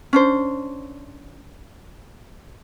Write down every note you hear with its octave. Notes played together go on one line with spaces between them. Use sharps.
C#4 D4 C5